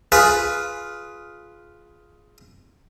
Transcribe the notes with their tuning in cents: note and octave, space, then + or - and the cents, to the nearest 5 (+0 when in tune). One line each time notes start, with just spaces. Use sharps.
F4 +0 G#4 +10 B4 +0